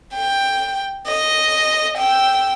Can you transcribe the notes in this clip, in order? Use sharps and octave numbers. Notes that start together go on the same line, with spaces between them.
G5
D#5
G5 E6